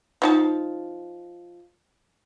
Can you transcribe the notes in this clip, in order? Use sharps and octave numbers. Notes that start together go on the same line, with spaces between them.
F3 D#4 A5